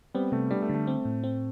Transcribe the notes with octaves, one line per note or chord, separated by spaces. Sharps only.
G3 B3 C4
C3 A3
G3 B3 D4
A3
D3
A3
C4
A2
C4